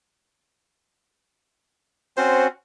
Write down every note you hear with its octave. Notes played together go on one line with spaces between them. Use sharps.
C4 C#4 F#4 C5